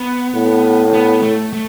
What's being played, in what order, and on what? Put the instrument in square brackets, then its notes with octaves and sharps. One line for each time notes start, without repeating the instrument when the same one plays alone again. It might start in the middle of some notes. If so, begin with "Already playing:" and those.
Already playing: [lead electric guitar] B3
[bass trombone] A2
[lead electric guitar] B3
A3
A3